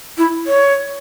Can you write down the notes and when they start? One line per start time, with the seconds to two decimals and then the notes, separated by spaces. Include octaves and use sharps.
0.18 E4
0.47 C#5